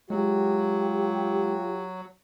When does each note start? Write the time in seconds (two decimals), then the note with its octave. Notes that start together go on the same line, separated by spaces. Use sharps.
0.10 F#3 G#3 F4 G4